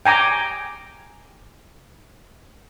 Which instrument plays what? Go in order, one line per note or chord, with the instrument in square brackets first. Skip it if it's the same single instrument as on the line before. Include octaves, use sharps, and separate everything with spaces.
[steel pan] G5 G#5 A#5 D6